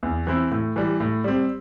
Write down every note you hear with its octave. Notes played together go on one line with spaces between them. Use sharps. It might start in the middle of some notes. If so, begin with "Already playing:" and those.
E2
E3 C4 E4
A2
E3 G3
A2
G3 C4